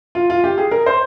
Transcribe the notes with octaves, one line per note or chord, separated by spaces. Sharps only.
F4
F4
G4
G#4
A#4
C5